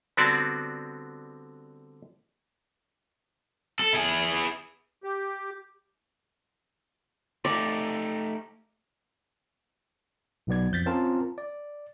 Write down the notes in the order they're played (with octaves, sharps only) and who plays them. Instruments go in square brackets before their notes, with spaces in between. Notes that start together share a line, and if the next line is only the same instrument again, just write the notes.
[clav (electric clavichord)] D3 G3 B3 C4 F#4 D5
[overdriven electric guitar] A4
E4 G#4
[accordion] G4
[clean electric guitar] A3 D#4 G4 [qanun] D5
[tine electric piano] B1 B2 B3 D5 G#6
F2 F3 G6 A6 B6
C4 C#4 F4 A#4 A5 A#5
D5